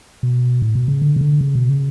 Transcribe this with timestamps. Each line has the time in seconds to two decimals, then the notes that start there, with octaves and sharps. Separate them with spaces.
0.23 B2
0.62 A2
0.75 B2
0.88 C#3
1.02 D3
1.16 C#3
1.21 D3
1.41 C#3
1.55 B2
1.69 C#3